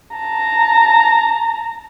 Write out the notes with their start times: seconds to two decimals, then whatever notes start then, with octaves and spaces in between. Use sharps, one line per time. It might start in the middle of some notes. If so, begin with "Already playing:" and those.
0.17 A5 A#5